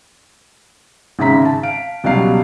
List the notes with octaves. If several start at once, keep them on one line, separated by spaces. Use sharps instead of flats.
G#1 C#3 E5 A#5 B6
A5
F5 D7
C#2 B2 F#3 G3 F5 C7